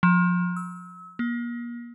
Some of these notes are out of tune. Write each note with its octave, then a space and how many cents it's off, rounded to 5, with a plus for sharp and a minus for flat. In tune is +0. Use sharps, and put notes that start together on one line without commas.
F3 +30
E6 -35
A#3 +35